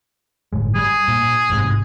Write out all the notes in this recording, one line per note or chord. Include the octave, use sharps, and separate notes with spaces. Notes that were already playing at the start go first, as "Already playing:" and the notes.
G1 A2 G#3
G3 G#4
A#2
A1 G#2 C3